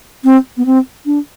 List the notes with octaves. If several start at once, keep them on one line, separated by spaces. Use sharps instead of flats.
C4
B3
C4
D4